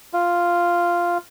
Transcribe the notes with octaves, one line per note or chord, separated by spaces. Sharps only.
F4